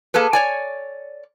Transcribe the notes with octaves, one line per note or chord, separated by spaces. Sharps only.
A#3 G#4 A4 B4
C#5 D5 G#5